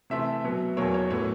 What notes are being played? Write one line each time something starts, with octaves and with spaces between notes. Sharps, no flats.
C3 E3 A3 C4 E5
B2 F#3 B3
E2 B2 F#3 A#3 C#5
C#5
A2 F#3 B3 C#5